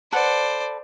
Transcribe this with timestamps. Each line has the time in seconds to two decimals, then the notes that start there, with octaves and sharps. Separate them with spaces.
0.12 A4 B4 C5 D5 F#5